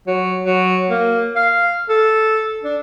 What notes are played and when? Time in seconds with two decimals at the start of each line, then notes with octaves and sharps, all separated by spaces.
0.07 F#3
0.44 F#3
0.89 A#3
1.36 F5
1.89 A4
2.63 D4